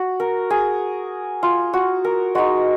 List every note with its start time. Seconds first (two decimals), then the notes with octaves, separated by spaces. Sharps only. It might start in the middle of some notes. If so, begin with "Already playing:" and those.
Already playing: F#4
0.20 A#4
0.50 G#4
1.43 F4
1.73 F#4
2.05 A#4
2.35 G#3 D#4 F#4